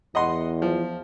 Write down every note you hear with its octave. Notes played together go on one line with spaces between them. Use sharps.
E2 D#5 F#5 C6
F3